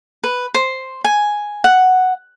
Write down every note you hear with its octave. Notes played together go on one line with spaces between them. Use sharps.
B4
C5
G#5
F#5